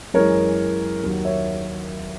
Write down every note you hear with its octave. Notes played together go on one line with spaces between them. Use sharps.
F#2 E3 G#3 A#4 C#5
D#2 D#3 F#3
C#5 E5